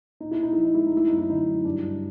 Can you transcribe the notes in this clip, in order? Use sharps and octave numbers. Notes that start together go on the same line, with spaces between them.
A#2 D#4
E4
A#2 D#4
F3 E4
D#4
G#3 E4
D#4
A3 E4
F#2 D#4
E4
D3 D#4
F#3
G2 D4
G2